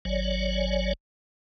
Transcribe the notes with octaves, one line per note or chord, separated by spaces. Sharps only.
G#1 F#3 C#5 D5